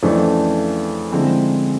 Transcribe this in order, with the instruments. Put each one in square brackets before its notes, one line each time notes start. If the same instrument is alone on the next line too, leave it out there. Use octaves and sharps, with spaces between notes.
[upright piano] F2 C#3 E3 A3 D4
D3 F3 G#3 C4 E4